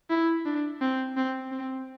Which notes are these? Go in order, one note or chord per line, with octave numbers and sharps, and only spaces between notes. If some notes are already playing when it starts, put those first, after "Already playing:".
E4
D4
C4
C4
C4